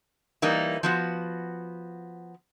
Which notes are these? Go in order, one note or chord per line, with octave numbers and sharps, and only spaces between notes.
E3 G3 A#3 D#4
F3 B3 F#4